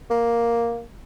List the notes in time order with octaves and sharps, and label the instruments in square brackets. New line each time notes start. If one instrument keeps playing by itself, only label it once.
[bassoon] A#3